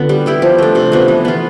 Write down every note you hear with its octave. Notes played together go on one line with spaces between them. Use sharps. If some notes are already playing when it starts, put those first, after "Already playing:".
Already playing: D3 B3 F4
G3
B3 E4 G4
F3
A3 D4
C3
F3 B3
E3
B3 F4